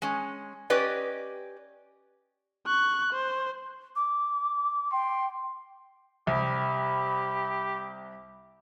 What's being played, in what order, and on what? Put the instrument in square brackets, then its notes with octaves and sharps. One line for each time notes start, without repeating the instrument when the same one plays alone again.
[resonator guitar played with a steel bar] G#3 C#4
C#4 G4 B4 D5 D#5
[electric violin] C#6 F#6
C5
[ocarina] D6
[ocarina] G5 [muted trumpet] C6
[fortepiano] C2 [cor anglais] G4 [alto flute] B5